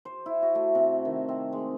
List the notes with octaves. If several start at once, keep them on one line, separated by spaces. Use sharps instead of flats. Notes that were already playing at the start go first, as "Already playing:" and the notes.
C5
E4
F#4
A3
C3
D#3
C4
G#3